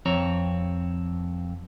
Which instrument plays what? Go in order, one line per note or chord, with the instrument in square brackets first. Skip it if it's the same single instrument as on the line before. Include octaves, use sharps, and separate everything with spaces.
[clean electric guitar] F2 C4 C#5 A#5